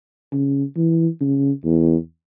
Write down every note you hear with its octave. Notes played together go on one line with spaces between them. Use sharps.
C#3
E3
C#3
E2